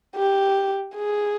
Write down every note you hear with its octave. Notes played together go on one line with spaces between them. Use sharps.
G4
G#4